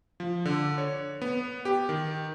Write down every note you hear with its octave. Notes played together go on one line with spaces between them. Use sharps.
F3
D3
C#5
B3
G4
D#3